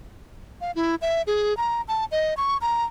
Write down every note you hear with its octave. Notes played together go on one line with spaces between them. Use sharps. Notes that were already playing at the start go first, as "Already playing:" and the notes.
F5
E4
E5
G#4
A#5
A5
D#5
C#6
A#5